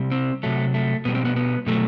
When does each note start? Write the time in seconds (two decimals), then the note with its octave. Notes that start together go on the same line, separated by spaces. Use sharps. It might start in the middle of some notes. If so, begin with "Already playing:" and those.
Already playing: C3 G3
0.12 C4
0.43 C3 F#3 A3
0.74 A3
1.05 B2 G3 B3
1.15 C4
1.25 B3
1.36 B3
1.67 B2 F#3 A3